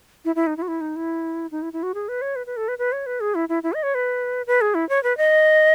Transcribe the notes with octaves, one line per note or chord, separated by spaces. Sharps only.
E4
E4
D#4
E4
F#4
E4
D#4
E4
D#4
E4
E4
F#4
G#4
B4
C#5
B4
B4
A4
B4
B4
C#5
B4
G#4
E4
E4
E4
D#5
C#5
B4
B4
G#4
E4
C#5
B4
D#5